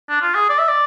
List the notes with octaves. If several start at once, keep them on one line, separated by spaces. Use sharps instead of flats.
D4
F4
G#4
D5
E5
D5